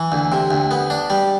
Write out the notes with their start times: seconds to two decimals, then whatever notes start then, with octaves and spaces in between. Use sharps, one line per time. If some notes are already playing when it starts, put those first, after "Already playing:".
Already playing: E3
0.12 D2
0.32 C3
0.51 D2
0.71 B3
0.90 D4
1.10 G3